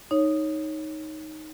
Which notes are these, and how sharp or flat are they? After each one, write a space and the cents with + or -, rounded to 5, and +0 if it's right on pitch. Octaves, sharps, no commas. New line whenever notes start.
D#4 +0 C#5 +0